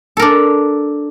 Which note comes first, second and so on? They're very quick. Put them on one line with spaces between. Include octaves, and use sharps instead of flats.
A4 A#4 D4